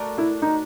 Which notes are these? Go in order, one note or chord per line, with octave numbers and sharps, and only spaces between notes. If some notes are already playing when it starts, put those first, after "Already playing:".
Already playing: A3 D4 F#4 A#4
E4
D#4